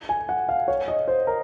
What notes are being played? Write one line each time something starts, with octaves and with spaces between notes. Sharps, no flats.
G#5
F#5
F5
C#5
D#5
C5
A#4